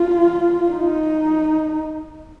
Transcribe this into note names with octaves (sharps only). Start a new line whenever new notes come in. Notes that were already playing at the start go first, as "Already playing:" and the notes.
Already playing: F4
D#4